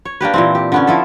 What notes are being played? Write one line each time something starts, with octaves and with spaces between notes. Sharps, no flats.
C#5
A#3 D4 G4 B4
A#2 E3 C4
G4
D3 B3 C#4
F3 E4 A4